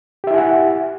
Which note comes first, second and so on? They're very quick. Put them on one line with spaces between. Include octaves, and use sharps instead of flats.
G4 E5 E4 G#5 F#5